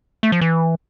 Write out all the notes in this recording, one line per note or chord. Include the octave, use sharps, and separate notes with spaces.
A3
F3
E3